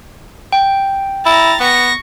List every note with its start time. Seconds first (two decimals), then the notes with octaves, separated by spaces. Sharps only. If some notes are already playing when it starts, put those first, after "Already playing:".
0.52 G5
1.26 E4 A#5 A6
1.60 B3 C#6 A#6